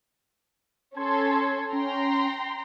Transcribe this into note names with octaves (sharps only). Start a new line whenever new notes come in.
C#4 A4 C6 G#6
C#4 G5 A#5 C6